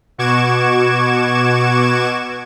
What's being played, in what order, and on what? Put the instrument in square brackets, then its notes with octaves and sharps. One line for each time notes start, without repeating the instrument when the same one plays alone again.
[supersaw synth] B2 F#4 C#6 D6 G#6 E7